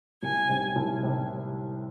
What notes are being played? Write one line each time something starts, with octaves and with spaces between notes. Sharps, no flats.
C2 G#5
C3 G3 C4
C2
C3 G3 C4